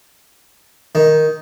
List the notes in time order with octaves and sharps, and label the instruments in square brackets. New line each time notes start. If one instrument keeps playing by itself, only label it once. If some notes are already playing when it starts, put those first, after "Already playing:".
[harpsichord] D#3